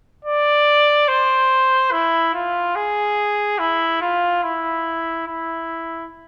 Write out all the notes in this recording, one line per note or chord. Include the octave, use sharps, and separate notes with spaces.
D5
C5
E4
F4
G#4
E4
F4
E4
E4